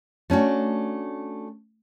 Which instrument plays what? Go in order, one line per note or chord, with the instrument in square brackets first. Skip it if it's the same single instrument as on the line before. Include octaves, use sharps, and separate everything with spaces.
[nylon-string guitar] A3 C#4 D4 F#4